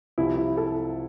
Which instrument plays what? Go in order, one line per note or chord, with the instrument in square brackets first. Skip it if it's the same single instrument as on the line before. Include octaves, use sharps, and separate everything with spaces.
[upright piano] C2 C3 F3 E4
E4
A4